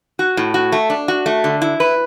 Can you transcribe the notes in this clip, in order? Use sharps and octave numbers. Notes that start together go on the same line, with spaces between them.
F#4
A2
F#4
A3
D4
F#4
A3
D3
E4
B4